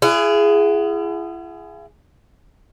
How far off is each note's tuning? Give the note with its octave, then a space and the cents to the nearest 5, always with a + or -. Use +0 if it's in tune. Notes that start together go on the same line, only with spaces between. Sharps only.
E4 +40 G#4 +0 F#5 +5